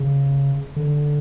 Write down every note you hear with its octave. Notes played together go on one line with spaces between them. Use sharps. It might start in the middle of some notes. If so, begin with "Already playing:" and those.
Already playing: C#3
D3